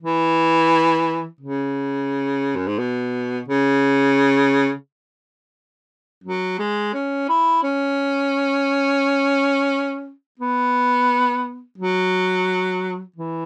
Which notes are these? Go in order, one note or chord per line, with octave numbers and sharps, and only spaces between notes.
E3
C#3
F#2
G#2
B2
C#3
F#3
G#3
C#4
E4
C#4
B3
F#3
E3